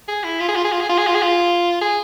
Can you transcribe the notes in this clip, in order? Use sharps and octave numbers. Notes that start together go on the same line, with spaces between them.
G#4
E4
F4
G#4
F4
G#4
F4
G#4
F4
G#4
F4
G#4
F4
G#4